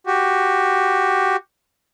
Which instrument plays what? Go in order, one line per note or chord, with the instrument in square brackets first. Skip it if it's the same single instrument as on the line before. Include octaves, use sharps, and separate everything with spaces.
[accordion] F#4 G4